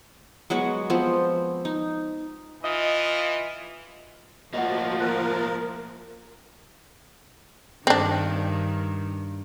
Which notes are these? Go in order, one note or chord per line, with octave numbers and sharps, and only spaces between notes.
F#3 G#3 B3 F#4
F3 B3 C4
D#4
E3 F4 D#5
A2 F3 A#3 F#4 D#5 F#5
A#4 F#6
G2 D#3 C4 D4